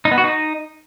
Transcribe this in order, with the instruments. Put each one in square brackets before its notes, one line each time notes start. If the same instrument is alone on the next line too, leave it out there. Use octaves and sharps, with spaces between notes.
[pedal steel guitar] D#4
B3
F#4
D#4